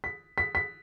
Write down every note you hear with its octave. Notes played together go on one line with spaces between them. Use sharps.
B6
B6
B6